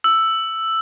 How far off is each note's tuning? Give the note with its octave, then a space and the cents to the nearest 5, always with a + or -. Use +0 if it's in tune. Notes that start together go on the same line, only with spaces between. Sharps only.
E6 +5